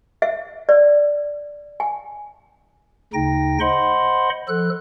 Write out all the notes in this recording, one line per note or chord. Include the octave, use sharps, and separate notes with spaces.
E5
D5
G#5
D2 C#3 D#4 G5 A#6
C5 D#5 F#5 B5 C6
F3 A4 F#6